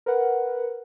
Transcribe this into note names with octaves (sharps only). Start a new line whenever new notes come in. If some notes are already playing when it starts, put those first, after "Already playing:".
A#4 B4 F#5